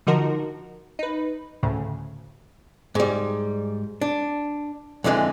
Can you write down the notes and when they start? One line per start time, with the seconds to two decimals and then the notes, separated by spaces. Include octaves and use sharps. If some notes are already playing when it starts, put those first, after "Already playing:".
0.07 D3 F3 D#4 F#4 A#4
0.99 D#4 B4
1.63 D2 A2 C#3
2.95 G#2 G3
4.01 D4
5.04 F2 D3 E3 G3 G#3